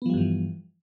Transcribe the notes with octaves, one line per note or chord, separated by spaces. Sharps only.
G2 E3 F3 G3 B3